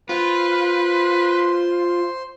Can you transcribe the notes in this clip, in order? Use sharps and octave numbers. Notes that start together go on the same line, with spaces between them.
F4 B4 C5 C6